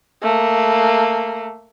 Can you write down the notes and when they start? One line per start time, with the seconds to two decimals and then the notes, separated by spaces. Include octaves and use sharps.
0.23 A3 A#3